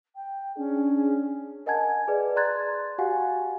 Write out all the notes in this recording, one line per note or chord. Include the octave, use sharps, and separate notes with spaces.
G5
C#4 D4 G#4
A#4 D#5 F#5 G#5 A5 G#6
G#4 B4 D5
D5 A#5 C6 F#6 G#6 A6
F#4 G4 F5 F#5 G#5